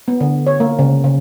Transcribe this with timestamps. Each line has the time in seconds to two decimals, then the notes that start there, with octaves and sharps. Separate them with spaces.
0.08 B3
0.21 D3
0.47 C#5
0.60 A#3
0.79 C#3
1.04 C#3